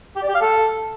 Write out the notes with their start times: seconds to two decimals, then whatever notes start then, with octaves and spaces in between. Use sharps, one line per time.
0.16 G4
0.22 D5
0.28 G4
0.35 F5
0.41 A4